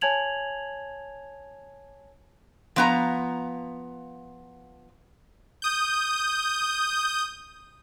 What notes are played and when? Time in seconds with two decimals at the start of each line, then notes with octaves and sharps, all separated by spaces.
0.01 C#5 G#5 A5 G#6 F7 F#7
2.76 F3 B3 A#5
5.62 D#6 G6